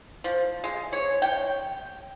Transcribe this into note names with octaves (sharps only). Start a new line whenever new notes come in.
F3
G#3
C#5
G5